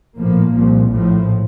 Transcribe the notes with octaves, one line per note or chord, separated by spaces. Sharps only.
A#1 A2 F3 A#3
C2 A#2 F3
A#1 A2 F3